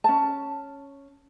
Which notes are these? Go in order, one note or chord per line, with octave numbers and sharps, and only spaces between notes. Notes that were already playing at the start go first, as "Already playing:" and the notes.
C#4 A5